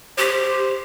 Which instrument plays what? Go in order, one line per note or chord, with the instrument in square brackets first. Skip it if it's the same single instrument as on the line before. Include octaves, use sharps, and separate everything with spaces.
[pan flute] G4 [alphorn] C5